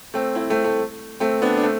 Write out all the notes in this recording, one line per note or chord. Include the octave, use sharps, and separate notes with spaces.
A3 C4
C4 E4
A3 C4
A3
A3 C4
B3 D4
D4
A3 C4